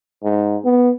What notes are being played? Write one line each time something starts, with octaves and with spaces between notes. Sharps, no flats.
G#2
B3